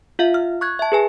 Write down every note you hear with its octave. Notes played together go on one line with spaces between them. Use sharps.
F4 E5 F5
F6
C#6 F#6 G#6
E5 A5
G#4 B4 G#5